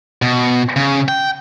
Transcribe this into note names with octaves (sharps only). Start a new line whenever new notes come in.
B2
C#3
G5